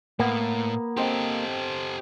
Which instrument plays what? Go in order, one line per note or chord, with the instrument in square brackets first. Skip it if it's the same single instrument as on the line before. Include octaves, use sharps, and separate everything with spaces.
[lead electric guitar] A2 [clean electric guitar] A#3 [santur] B3
[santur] C4 C5 D#5 [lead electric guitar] G4 A4